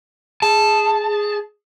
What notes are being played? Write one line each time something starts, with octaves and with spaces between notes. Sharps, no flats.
G#4 A5